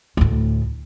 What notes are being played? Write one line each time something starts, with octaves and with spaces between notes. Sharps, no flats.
D2 A2